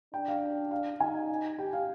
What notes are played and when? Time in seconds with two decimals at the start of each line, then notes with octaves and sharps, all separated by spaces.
0.13 D4 G5
0.28 F5
0.71 F5
1.00 D#4 G#5
1.58 G4 G5
1.73 F5